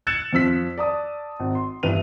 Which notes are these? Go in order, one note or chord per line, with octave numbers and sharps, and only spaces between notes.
E6 F#6 G#6 A6 C#7 E7
F2 F3 E6 B6
D5 A5 D#6
G#1
C6
G1 G2 E3 D#7 F7